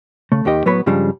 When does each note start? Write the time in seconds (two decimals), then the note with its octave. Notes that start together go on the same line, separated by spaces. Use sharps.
0.32 C#3 A3
0.45 D#2 D#3 G4 D#5
0.66 A2 F#3 B3 B4 C#5 B5
0.86 G2 C#3 F3 G3 G#3 D4